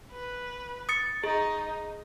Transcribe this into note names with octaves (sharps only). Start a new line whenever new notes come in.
B4
D#6 A6 C#7
D#4 G#4